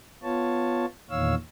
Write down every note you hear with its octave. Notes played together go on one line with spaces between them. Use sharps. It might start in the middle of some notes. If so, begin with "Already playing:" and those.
B3 F4 C#5 A5
E2 A#2 D#3 C#5 F5 E6